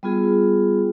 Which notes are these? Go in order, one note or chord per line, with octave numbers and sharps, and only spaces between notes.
G3 B3 F4 G#4